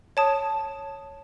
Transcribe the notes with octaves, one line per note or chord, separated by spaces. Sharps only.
C#5 A5 D#6